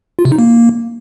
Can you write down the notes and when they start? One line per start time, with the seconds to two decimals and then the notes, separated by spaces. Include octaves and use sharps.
0.19 F4
0.25 C3
0.32 D#4
0.39 A#3